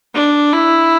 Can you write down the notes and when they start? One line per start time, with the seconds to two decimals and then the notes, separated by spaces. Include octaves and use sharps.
0.15 D4
0.52 E4